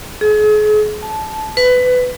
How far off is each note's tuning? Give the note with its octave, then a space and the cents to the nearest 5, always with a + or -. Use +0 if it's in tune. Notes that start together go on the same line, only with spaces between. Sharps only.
G#4 +40
A5 -15
B4 +20